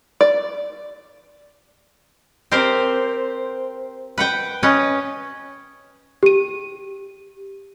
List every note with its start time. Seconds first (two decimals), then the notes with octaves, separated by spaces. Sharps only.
0.21 D5
2.52 C4 G4 A#4 C5
4.18 B4 F#5 G5
4.63 C#4 B4 D#5
6.23 G4 D#7